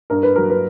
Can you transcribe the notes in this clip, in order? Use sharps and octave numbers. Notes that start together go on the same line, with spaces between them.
G2 A#4
B4
F#3 A#4
B4